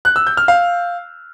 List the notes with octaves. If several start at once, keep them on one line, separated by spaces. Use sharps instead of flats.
F#6
E6
G6
F6
F5